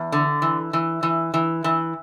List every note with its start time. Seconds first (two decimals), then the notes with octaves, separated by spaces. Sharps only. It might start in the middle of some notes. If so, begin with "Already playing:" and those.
Already playing: E2
0.12 D3
0.42 E3
0.73 E3
1.03 E3
1.34 E3
1.64 E3